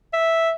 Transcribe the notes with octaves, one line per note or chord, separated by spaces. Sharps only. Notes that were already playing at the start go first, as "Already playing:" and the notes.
E5